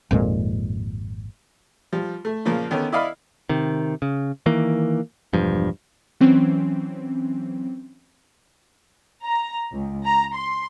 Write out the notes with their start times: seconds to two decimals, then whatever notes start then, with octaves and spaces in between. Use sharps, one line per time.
0.11 G#1 F2 A#2 G#3
1.93 F3 G3
2.25 A3
2.45 A#2 C#3 F3 A#3
2.71 D3 D#3 B3 C#4
2.92 E4 D5 D#5 F5 B5
3.49 C3 D#3
4.02 C#3
4.46 D#3 E3 A#3
5.33 E1 G2 F3
6.20 E3 F#3 C4 C#4
9.23 A#5
9.72 C#2
10.06 A#5
10.36 C6